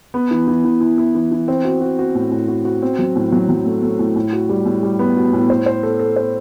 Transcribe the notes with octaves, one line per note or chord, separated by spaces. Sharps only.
B3
E3
E3
E3
E4
E4
E3
E3
C4
F#4
F#4
F#4
A2
A2
F#4
F#4
C4
F#3
A2
F#3
F#3
A3
A3
A2
A2
F#4
G3
A2
G3
B3
F#4
A2
C5
C5
A4
A4
C5